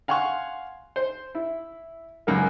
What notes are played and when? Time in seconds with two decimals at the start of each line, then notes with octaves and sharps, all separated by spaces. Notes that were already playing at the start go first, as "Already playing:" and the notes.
0.08 F5 F#5 G#5 C6 C#6
0.96 C5
1.35 E4
2.27 C#2 F#2 F#3 A#3